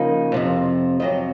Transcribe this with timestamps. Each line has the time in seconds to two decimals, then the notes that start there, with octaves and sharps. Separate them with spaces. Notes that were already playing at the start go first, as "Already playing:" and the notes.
Already playing: C#3 F3 A#3 D#4
0.32 F2 C3 F3
1.00 F2 C3 F#3 D#5